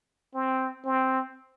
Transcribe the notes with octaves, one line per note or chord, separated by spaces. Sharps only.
C4
C4